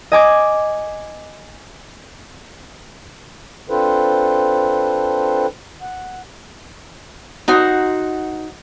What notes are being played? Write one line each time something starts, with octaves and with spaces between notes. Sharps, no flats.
D#5 G#5 D6 G#6
C4 D4 F4 A4 B4 C5
F#5
D#4 F#4 C5